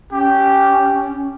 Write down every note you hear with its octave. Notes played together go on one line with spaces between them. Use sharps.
C#4 G4